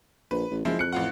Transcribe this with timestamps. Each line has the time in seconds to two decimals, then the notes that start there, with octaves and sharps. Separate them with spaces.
0.31 A#1 B4
0.51 A1
0.65 F#1 F3 G#3 E4
0.79 F2 F#6 C#7
0.93 A1 F4 F#5